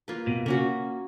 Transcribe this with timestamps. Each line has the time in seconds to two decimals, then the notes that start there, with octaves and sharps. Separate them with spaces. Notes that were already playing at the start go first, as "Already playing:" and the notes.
0.08 A#3 F4 B4
0.27 B2
0.46 C#3 A#3 C#4 F#4